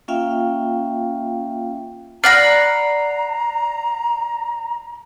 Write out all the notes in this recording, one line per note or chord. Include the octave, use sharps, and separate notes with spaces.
A#3 C#4 F4 E5 F5 G5
D5 F#5 A#5 B5 F6 A#6 C7